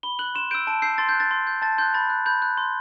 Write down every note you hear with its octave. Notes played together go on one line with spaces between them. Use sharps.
B5 G7
F#6 F#7
C6 E7
E6 G6 D7
A5 D7
E6 G6 C7
C6 A6
G6
F#6
A6
C6
G6
A5 A6
C6 F#6 G6
B5 A6
F#6
B5 G6
F#6
C6